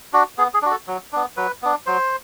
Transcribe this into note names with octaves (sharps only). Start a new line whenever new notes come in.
D4 F#4
B3 G#4
G#4
D4 F#4
A4
F#3
B3 D4
F#3 B4
B3 D4
F#3 C5